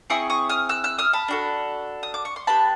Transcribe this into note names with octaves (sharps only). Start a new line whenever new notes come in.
C4 E4 G#4 C#6 D#6
C#6 D#6
D#6 F6
E6 F#6
E6 F#6
D#6 F6
A5 B5
D4 F#4 A4
D#6
D6
C#6
C6
B3 D4 G4 A5 B5